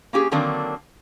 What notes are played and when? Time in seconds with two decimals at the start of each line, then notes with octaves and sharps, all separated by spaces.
0.13 A#3 C#4 G4 G#4
0.32 D3 D#3 F#3 A#3 C4 D4